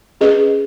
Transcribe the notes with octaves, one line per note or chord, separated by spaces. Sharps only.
C#4 G#4 B4 D#5